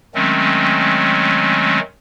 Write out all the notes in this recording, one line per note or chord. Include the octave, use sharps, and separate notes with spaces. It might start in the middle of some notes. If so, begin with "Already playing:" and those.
D#3 F#3 G#3 A3 C4 C#4